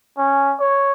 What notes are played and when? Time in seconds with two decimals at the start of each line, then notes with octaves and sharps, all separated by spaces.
0.17 C#4
0.60 C#5